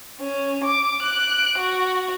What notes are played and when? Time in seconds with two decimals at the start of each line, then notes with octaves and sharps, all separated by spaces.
0.20 C#4
0.64 D6
1.02 F#6 D7
1.58 F#4